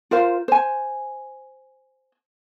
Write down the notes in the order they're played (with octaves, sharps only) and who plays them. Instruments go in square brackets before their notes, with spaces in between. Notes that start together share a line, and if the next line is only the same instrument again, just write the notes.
[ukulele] F4 A#4 C5 F5
C5 G#5